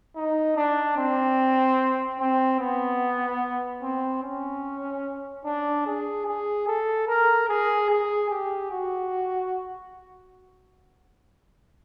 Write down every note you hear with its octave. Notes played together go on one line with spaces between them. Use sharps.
D#4
D4
C4
C4
B3
C4
C#4
D4
G#4
G#4
A4
A#4
G#4
G#4
G4
F#4